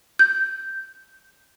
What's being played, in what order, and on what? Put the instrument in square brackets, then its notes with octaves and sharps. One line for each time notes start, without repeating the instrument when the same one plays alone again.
[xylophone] G6